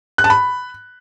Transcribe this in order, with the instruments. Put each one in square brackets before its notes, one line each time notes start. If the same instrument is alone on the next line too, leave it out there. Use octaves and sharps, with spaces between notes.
[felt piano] F#6
A5
B5